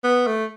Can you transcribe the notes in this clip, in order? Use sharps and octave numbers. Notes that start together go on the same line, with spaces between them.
B3
A3